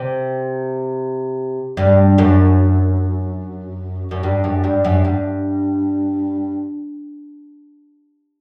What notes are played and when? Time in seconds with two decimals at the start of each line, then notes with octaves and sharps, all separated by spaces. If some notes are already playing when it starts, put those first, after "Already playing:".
Already playing: C3
1.77 G2
2.18 F#2
4.11 F#2
4.23 G2
4.44 F#2
4.64 G2
4.85 F#2
5.05 G2